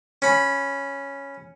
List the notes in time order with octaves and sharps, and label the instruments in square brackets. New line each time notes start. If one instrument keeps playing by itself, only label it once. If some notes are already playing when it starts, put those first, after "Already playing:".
[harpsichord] C#4 B5